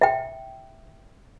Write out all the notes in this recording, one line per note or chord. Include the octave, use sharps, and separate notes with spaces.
E5 G5